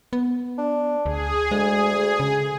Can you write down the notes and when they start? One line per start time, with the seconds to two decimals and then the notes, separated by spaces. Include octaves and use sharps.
0.13 B3
0.58 D4
1.06 D2 G#4
1.51 D2 G#3
2.20 C#3